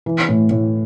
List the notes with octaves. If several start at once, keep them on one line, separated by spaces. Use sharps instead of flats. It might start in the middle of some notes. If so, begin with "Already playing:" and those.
E3
A2
A2